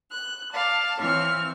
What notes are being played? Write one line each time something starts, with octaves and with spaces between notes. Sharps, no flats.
F#6
D5 F5 A5
E3 C4 C#5 F6